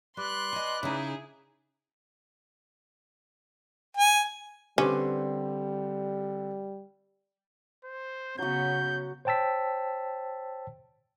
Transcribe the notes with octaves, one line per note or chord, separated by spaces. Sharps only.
G3 B4 D5 C6 F#6
D#5 G#5
C#3 D#4 E4 G#4
G#5
D3 G3 C4 C#4 G4 B4 C5
C5
C#3 F#3 B3 F#4 G6
C5 C#5 G5 A5 E6 B6